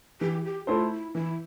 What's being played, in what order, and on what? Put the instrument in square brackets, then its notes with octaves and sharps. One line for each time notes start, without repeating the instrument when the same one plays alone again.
[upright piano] E3 [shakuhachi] G4
[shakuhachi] G4
[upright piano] A3 E4 A4 C5 [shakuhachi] F4
[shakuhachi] E4
[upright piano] E3 [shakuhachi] E4